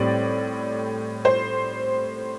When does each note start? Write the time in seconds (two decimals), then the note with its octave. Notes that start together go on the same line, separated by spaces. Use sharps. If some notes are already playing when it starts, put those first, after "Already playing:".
Already playing: A2 G3 C4 D5
1.25 C5